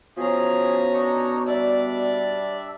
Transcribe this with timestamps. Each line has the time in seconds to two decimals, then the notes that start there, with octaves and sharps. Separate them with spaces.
0.17 B2 F3 C#4 G#4 A#5
0.93 D4 D#4 C#5
1.47 G3 D4 D5 E5